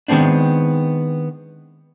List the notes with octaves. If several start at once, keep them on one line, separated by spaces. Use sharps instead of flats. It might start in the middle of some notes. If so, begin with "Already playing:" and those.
D#3 G#3 B3 C4 D4